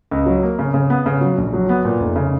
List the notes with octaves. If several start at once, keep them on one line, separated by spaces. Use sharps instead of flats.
C#2
F#3
A#3
C#3
C#3
B3
C#3
F#3
A#1
F#3
B3
A#2
F1
C#3